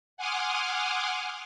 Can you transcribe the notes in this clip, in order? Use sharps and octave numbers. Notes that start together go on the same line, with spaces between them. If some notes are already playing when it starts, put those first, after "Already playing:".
F#5 G#5 C6 D6 D#6 F6